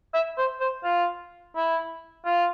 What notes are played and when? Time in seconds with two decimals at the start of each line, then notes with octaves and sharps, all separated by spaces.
0.14 E5
0.38 C5
0.60 C5
0.84 F4
1.56 E4
2.25 F4